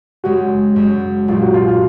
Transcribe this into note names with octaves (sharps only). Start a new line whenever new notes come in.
F#2 C#3 G#3 F#4
F#2 C#3 G#3
B1 A#2 F#3 F4
F#4
F4
F4